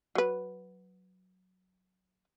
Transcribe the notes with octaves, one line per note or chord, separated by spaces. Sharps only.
F#3 B4